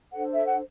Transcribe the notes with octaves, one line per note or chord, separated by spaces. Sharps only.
D4 A4 C5 F#5
E5
F#5